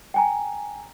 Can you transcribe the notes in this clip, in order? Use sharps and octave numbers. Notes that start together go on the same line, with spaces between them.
G5 G#5 A#5